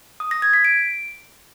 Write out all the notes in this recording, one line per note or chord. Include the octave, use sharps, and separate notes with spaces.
D#6
A#6
G#6
B6
D7